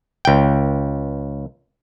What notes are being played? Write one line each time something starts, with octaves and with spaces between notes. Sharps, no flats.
C#2 G5